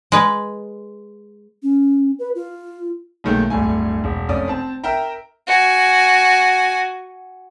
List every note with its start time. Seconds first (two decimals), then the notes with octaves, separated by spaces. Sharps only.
0.12 G#3 B4
1.63 C#4
2.19 B4
2.35 F4
3.24 B1 A#2 D#3 G#3 A3
3.50 D1 G2 A3 G#5
4.04 E1
4.29 F1 C#4 D5 D#6
4.48 C4 A5
4.84 A#4 E5 G5 A#5
5.47 F#4 G#5